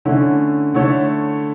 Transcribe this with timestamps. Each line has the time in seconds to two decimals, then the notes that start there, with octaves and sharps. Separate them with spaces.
0.05 D3 A3 C#4 E4
0.74 D3 A3 E4 A4 C#5